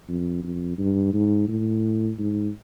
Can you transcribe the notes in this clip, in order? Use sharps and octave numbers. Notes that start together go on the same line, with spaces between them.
F2
F2
G2
G#2
A2
G#2